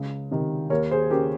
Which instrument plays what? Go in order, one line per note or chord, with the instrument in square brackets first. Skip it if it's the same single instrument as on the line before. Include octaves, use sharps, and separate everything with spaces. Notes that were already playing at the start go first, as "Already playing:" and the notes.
Already playing: [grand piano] C#2
C3 D#3
D#2 A#4 C#5
G#4 C5
C#3 G4 A#4